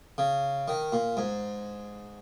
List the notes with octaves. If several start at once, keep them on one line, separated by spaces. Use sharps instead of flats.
C#3
D#3
A#2
G#2